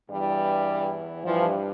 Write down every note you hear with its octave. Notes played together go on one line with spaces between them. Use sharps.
E2 G2 E3 G3
G2 E3 F3